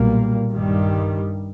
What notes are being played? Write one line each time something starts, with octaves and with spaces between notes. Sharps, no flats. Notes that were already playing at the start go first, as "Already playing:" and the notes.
Already playing: B1 A#2 G3 A#3
G2 D#3 G3